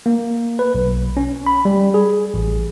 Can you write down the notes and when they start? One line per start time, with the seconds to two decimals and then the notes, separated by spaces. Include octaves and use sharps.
0.06 A#3
0.59 B4
0.75 B1
1.17 C#4
1.46 B5
1.65 G3
1.94 G#4
2.34 A1